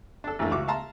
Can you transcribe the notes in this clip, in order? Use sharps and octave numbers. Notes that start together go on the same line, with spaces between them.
D4 A4
A1 A2 E3 A3 A#3
C#2 F#4 D6
E5 F5 A5 A#5 C6